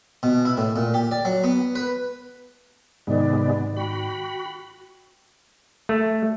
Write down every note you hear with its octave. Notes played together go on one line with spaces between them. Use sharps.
B2
E4
A2
A#2
G4
D5
F#3
B3
B4
G#2 C3 D#3 G#3 B3 D5
F#4 G5 B5
A3